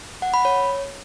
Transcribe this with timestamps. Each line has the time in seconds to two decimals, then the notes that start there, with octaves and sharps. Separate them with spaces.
0.22 F#5
0.34 B5
0.45 C#5